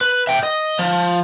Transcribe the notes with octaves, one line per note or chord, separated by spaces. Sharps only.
B4
E5 G5
D#5
F3